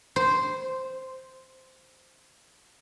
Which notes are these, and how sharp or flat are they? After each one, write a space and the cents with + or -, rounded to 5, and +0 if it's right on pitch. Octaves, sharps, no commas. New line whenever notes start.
C5 -5